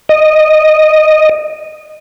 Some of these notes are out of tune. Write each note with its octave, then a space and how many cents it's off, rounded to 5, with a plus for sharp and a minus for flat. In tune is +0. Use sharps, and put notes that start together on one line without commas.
D#5 -10